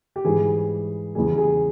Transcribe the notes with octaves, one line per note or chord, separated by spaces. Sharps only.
G4
G#2 E3 G3 G#4
E2 C#3 E3 G3 G#4
G#4